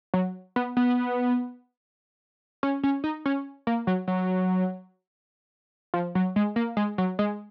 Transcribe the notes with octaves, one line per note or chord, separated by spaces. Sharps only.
F#3
B3
B3
C#4
C#4
D#4
C#4
A#3
F#3
F#3
F3
F#3
G#3
A#3
G#3
F#3
G#3